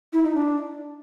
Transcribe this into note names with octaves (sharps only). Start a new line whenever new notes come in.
E4
D#4
D4